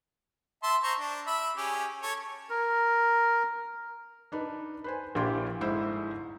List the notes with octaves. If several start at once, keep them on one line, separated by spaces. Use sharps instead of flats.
E5 A5 C6
C5 A#5 C#6
D4
E5 B5
C#4 G4 G#4
A4 C#5
A#4
D4 D#4 B4
B4 C5 G#5
A#1 A#2 E4 G4 G5 C6
G1 G#2 E4 C5 E6